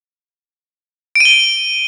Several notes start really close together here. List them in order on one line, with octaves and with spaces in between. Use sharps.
D7 D#7 G7